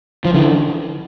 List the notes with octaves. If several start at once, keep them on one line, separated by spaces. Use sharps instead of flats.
F3
D3 E3